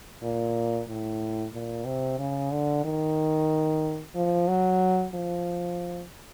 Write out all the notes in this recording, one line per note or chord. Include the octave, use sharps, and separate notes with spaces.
A#2
A2
A#2
C3
C#3
D3
D#3
F3
F#3
F3